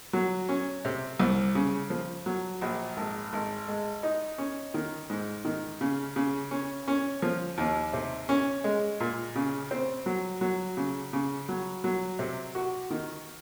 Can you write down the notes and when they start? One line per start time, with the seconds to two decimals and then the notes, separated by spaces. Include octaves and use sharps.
0.13 F#3
0.49 C#4
0.85 C3
1.20 C2
1.55 C#3
1.90 F3
2.26 F#3
2.62 A#1
2.97 G#1
3.33 G#1
3.68 G#3
4.03 D#4
4.38 C#4
4.74 D#3
5.10 G#2
5.45 D#3
5.81 C#3
6.16 C#3
6.51 C#4
6.88 C#4
7.22 F3
7.58 D#2
7.93 C3
8.29 C#4
8.64 G#3
9.00 A#2
9.36 C#3
9.71 C4
10.06 F#3
10.41 F#3
10.77 C#3
11.13 C#3
11.49 F#3
11.84 F#3
12.19 C3
12.55 F#4
12.90 D#3